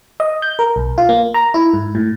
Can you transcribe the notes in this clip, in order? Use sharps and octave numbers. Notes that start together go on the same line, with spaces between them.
D#5
G6
A#4
B1
F4
A#3
A#5
E4
G#2
A2